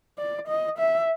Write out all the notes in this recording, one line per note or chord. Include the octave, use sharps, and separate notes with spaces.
D5
D#5
E5